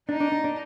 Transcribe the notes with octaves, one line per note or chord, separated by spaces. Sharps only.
D4 D#4
D4
D4
D4